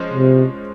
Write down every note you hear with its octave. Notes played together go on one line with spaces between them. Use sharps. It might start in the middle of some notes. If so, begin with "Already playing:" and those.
Already playing: F3 G#3 C#4 C5
C3